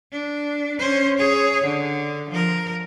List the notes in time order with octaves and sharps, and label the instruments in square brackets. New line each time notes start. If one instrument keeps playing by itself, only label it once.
[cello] D4
C#4 C5
G#4 C#5
D3
F3 A#4